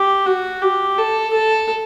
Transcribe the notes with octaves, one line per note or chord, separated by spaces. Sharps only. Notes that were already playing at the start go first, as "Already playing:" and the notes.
Already playing: G4
F#4
G4
A4
A4